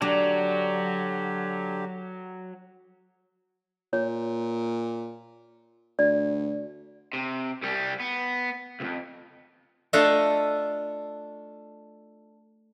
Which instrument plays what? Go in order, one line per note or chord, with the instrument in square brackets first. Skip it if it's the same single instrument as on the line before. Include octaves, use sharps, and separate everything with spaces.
[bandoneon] D3 G4 [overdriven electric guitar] F#3 [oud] D4
[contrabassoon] A#2 [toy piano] C#5
[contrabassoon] D2 [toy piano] D5
[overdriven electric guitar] C3
C2 G3
B3
C2 F2
[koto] A3 D4 F4 A4 D#5 E5